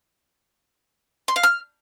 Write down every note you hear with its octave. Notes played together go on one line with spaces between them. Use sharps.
C6
F5
F6